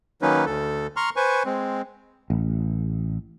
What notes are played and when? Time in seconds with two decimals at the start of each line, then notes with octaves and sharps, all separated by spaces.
0.22 D#3 F#3 A#3 C#4 D#4 B4
0.46 D2 A4
0.96 A#5 C6 C#6 F6
1.16 B4 C5 G#5 C#6
1.45 G#3 C4
2.30 A1